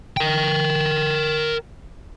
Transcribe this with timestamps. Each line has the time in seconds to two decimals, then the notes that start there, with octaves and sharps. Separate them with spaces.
0.17 A#4 G5